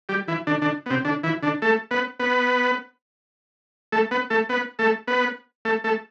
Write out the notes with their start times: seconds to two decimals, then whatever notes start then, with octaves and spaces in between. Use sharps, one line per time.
0.09 G3 G4
0.28 E3 E4
0.47 D3 D4
0.62 D3 D4
0.86 B3
0.91 C3 C4
1.05 D3 D4
1.24 E3 E4
1.43 D3 D4
1.62 A3 A4
1.91 B3 B4
2.20 B3 B4
3.92 A3 A4
4.11 B3 B4
4.30 A3 A4
4.49 B3 B4
4.79 A3 A4
5.08 B3 B4
5.65 A3 A4
5.84 A3 A4